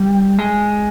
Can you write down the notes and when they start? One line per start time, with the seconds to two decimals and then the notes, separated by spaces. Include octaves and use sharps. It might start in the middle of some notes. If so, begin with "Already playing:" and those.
Already playing: G3
0.39 G#3